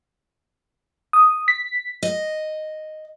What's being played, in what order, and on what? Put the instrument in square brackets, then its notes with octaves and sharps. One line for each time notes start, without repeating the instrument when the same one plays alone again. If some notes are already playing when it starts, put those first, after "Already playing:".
[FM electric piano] D#6
B6
[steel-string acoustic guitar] D#5